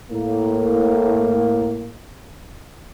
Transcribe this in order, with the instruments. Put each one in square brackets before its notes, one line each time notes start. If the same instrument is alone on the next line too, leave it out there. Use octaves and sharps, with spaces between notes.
[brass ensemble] A2 A#3